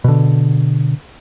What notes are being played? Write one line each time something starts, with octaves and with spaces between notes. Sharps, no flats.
B2 D3